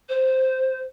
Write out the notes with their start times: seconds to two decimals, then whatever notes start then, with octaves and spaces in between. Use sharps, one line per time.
0.09 C5